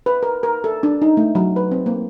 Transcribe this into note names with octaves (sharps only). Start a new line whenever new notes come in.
B4
A#4
A#4
A4
D4
D#4
A3
F#3
B4
C4
A#3